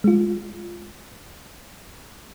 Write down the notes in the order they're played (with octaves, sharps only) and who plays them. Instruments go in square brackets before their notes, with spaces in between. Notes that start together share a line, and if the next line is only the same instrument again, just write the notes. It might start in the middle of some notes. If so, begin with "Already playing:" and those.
[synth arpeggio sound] G#3 F4